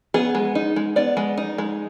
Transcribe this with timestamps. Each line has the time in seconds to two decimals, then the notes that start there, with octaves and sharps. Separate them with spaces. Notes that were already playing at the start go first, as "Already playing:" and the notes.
0.14 B3 G#4
0.35 G#3
0.55 D#4
0.76 G#3
0.96 B3 D5
1.17 G#3
1.38 D#4
1.58 G#3